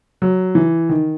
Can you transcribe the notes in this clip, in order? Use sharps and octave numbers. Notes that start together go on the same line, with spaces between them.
F#3
E3
D#3